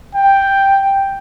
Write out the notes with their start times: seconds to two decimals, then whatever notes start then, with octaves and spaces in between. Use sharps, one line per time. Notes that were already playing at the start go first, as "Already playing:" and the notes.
0.15 G5